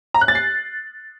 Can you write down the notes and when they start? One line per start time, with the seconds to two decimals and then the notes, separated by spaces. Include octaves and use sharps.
0.14 A#5
0.21 F#6
0.28 A6
0.35 C7